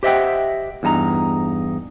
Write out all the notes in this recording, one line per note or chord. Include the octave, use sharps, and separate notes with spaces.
G4 C5 D#5 E5 F#5 G5
E2 G2 D#4 A5 A#5